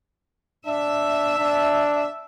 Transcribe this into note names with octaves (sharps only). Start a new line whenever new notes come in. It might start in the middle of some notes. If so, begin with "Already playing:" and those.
D4 E5
D4